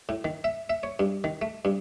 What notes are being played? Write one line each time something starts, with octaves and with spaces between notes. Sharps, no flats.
A2
D#3
E5
E5
C#5
G2
D#3
A3
G2